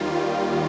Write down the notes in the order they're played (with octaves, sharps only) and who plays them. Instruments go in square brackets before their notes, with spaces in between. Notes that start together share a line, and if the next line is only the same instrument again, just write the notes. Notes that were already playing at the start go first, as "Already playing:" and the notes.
Already playing: [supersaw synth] D#2 D#3 G3 F4